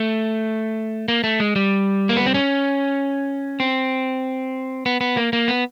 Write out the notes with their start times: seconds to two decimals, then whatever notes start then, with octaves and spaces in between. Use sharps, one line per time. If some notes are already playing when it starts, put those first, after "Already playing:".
Already playing: A3
1.08 A#3
1.24 A3
1.40 G#3
1.56 G3
2.09 A#3
2.17 B3
2.26 C4
2.34 C#4
3.60 C4
4.86 B3
5.01 B3
5.17 A#3
5.33 A#3
5.48 B3